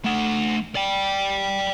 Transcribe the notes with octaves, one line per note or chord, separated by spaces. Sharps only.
A3 F#5
D5 G5